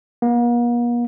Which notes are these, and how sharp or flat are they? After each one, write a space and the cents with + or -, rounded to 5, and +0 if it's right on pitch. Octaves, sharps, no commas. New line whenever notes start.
A#3 +45